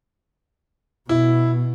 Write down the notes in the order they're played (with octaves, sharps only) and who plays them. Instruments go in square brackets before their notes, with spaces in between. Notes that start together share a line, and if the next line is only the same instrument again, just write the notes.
[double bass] B2 [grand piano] E4